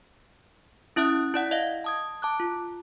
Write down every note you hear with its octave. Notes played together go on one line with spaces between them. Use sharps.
C#4 E4 E5 D#6 F#6
E4 D5 F#5
D#5 F5
A5 D#6 G#6
A5 D6 F#6
F4